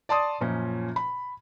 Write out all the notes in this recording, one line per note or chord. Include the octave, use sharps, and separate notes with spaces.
D5 A5 C6 D#6
F#2 A#2 F3 C#4
B5